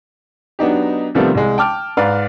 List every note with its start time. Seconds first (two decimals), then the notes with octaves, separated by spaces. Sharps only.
0.59 F#3 B3 D4 D#4 G4
1.15 C3 D#3 F3 G3 A3 B3
1.35 C2 G#3
1.58 G5 A5 D6 F6
1.97 G#2 B4 D5 F5 F6